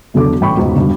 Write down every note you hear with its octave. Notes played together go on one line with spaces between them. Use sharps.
E1 B1 D3 A4 D6
A1 G5 B5 C#6
E1 C#2 G#2
E1 G2 D3